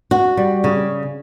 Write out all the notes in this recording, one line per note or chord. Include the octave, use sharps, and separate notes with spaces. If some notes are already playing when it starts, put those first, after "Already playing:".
F#4
G3
C#3